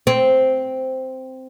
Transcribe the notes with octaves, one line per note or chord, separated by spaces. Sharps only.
C4